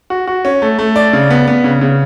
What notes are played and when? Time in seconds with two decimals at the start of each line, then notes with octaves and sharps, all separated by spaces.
0.10 F#4
0.27 F#4
0.45 C#4
0.62 A3
0.79 A3
0.96 D5
1.13 C#3
1.30 B3
1.48 B3
1.64 C#3
1.81 C#3